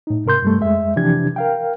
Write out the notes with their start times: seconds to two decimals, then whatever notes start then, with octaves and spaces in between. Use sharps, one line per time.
0.07 A2 D#4
0.26 G#2 C3 A#4 C6 G6
0.42 G2 G3 A3
0.60 F2 G#3 E5
0.96 C3 E3 F3 D4 G4 G#6
1.36 A#4 F5 G5